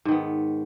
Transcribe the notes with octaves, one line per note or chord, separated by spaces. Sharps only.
G#2 D#3 B3